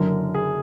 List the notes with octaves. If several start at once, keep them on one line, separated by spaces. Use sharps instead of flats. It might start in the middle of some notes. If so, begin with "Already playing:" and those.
Already playing: F#1 F#2 D3 F#3 A#4
G#4